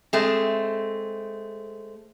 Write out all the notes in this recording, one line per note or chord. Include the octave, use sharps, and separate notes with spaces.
G#3 A3 C4